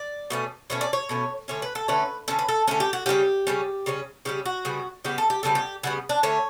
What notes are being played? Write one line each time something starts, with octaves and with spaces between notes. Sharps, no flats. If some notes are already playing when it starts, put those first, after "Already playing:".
Already playing: D5
B2 A3 C#4
B2 A3 C#4 C#5
D5
C#5
B2 A3 C#4
D3 A3 C#4 C#5
B4
A4
D3 A3 C#4 B4
D3 A3 C#4 A4
B4
A4
D3 A3 C#4 A4
G4
F#4
C#3 G3 C#4 G4
C#3 G3 C#4
C#3 G3 C#4
C#3 G3 C#4 G4
F#4
C#3 G3 B3
C#3 G3 B3 G4
A4
G4
C#3 G3 B3 A4
G4
C#3 G3 B3 F#4
D4
D3 A3 C#4 C#5